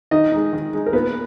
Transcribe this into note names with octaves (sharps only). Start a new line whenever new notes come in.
D#3 D#4 D#5
G#3 D#4
D#3
G#3 D#4
A#4
A#2 B3 B4